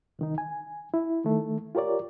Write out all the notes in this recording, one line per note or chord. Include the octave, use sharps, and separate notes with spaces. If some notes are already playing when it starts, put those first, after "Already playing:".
C2 D#3 D#4
G#5
E4
D#3 A3
F4 G4 A#4 C#5 D5